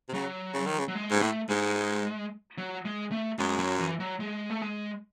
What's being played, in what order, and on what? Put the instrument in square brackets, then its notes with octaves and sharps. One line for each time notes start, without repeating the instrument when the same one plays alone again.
[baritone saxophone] C3
[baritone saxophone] C#3 [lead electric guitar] F#3
[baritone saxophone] C#3
D#3
C#3
[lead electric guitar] F#3
G#3
[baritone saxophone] G#2
[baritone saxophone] A2 [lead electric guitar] A3
[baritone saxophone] G#2 [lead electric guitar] G#3
[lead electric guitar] F#3
G#3
A3
[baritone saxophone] F#2 [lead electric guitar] G#3
[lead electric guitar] F#3
E3
F#3
G#3
A3
G#3